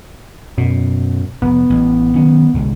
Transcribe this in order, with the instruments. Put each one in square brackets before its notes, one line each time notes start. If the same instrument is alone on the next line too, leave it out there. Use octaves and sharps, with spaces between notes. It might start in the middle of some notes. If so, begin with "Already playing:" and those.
[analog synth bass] F#2 [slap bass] B2
[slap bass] F1 [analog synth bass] B3
[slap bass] A1
D#3 F#3 C#4
G1 C2 G#3